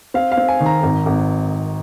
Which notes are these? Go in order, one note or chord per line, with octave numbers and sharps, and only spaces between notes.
C4 F5
F5
C4
G#5
D#3
A#5
G#1
G#1